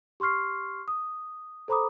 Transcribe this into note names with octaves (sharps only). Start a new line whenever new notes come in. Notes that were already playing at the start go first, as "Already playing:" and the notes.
G4 C6 C#6 F6 C7
D#6
A4 C5 A#5 B5 D6 D#6